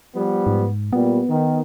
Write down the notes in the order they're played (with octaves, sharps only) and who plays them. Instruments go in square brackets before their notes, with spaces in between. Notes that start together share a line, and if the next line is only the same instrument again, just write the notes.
[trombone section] F3 G3 B3
[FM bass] G#2
[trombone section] A#2 G3 [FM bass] B3
[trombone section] D#3